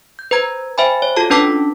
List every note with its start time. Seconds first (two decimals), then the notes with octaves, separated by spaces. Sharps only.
0.19 G6
0.31 B4 C5 A#5 G#6
0.78 C5 E5 G5 G#5 B5
1.02 C#5
1.16 F4 F#4 A4 A5
1.30 C#4 D4 B4 A5 D6 B6